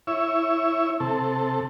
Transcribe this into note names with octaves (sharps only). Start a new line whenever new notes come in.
E4 C#5 E5
C3 A4